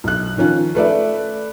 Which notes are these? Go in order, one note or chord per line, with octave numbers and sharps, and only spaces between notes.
B1 F#6
D#3 F3 C#4 F4
A3 B4 D5 E5